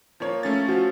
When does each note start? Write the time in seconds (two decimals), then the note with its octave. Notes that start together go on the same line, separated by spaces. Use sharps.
0.20 F3 A#3 C#5
0.43 A3 C#4 A6
0.68 F3 F#4